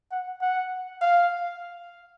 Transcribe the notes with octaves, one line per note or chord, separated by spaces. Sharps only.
F#5
F#5
F5